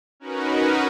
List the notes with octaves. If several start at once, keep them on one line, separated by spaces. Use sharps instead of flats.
C#4 D#4 F#4 A#4 B4